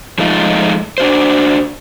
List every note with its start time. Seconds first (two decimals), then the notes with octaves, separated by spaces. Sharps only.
0.18 F3 G#3 A3 D#4 F4
0.98 D4 F#4 C5